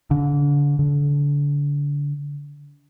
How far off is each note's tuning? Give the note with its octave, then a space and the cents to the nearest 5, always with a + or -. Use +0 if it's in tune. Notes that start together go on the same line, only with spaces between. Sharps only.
D3 -35
D3 -30